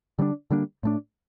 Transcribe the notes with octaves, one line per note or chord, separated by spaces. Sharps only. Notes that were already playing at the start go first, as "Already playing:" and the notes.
D3 G3 A#3 D4
D3 G3 A#3 D4
A2 A3 D4